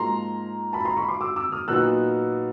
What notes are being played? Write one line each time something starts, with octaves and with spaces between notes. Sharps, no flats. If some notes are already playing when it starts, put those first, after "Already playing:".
Already playing: G#2 F3 A#3 A#5 C6
A5 B5
A#5 C6
B5 C#6
C6 D6
D6 E6
D6 E6
D#6 F6
A#2 F#3 B3 D#4 F#4 E6 F#6